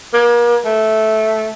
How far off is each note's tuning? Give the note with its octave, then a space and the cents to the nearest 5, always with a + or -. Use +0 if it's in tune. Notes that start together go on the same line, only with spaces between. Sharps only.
A#3 +40
A3 -10